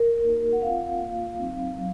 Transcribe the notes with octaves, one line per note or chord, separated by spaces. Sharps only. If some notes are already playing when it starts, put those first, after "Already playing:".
Already playing: A#4
A#3 D#4 F#4
F#5
C4 F4 F5
A#3 F4
F#3 C4 D#4
F#3